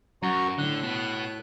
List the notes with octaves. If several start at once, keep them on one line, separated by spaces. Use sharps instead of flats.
F#2 F#4 A#5 C#6
A2 D3 F#6
B2 B3